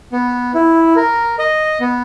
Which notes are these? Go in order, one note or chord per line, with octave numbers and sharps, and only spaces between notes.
B3
E4
A#4
D#5
B3